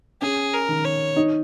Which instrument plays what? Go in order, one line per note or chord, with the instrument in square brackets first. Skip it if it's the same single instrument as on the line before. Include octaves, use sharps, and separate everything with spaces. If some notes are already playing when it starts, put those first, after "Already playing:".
[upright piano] C#4 [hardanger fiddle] G#4
[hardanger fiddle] A#4
[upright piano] D#3
[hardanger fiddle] C#5
[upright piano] D#4